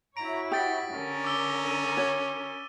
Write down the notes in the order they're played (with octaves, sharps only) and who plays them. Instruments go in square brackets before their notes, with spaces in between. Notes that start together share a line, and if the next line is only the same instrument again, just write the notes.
[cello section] E4 F#4 C#5 [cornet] A#5 [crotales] D7
[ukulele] G4 F#5 [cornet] G5 [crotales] D#6 A6 B6
[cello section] D3 A#4 [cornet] C#4
[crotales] D6 E6 G7
E6 D#7
[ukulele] F#4 C#5